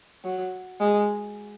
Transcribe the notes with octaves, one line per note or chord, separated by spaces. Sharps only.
F#3
G#3